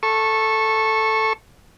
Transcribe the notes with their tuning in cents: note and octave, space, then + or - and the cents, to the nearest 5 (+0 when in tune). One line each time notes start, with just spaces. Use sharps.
A4 +0 C#6 -20